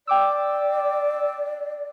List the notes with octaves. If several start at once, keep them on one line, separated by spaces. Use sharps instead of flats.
D5 G5 D6 E6